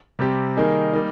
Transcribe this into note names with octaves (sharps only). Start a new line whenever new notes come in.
C3 G3 C4 G4
D#3 G3 A#3 D#4 G#4
G3 A#3 D#4